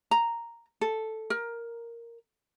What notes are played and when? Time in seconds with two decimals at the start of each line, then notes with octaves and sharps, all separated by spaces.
0.11 A#5
0.81 A4
1.30 A#4